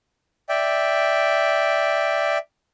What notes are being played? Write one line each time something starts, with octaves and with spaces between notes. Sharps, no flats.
D5 E5 G5